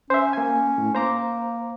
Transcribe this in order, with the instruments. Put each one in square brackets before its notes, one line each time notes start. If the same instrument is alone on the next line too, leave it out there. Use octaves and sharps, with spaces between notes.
[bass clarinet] C#4 [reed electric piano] C5 E5
[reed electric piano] A#3 G#5
A2
[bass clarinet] A#3 [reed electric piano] C5 A#5 D6